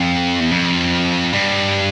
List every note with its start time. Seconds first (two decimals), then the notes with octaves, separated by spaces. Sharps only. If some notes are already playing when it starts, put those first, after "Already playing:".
Already playing: F2
0.41 E2
0.51 F2
1.33 G2